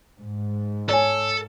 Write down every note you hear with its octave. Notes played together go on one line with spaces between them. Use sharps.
G#2
A4 C#5 G#5